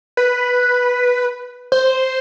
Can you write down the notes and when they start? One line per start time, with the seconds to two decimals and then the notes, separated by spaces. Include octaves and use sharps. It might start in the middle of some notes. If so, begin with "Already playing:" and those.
0.17 B4
1.72 C5